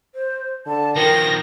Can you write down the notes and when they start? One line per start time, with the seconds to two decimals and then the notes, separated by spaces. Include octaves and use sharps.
0.15 C5
0.67 D3 A5
0.96 D#3 F3 A#4 G5 A#6